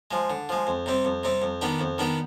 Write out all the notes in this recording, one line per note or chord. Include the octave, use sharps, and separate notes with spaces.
F3 G#3
D3
F3 G#3
F2
C3 G3 C4
F2
C3 G3 C4
F2
D#3 B3 D4 G4
F2
D#3 B3 D4 G4